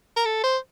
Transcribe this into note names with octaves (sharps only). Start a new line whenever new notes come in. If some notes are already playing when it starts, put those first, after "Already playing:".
A#4
A4
C5